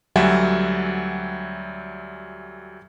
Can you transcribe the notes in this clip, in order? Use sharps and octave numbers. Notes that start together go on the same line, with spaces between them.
D2 F#3 G3 E5 F#5 G#5